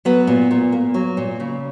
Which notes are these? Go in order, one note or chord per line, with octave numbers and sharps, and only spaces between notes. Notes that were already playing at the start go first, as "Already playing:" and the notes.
F#3 B3
A#2
A#2
A#3
F#3
A#2
C#3